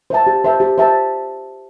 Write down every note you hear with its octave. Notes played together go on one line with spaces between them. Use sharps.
C5 E5 A5
G4
C5 E5 A5
G4
C5 E5 A5